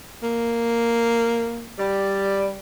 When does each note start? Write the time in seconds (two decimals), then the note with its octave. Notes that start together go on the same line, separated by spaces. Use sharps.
0.23 A#3
1.79 G3 D5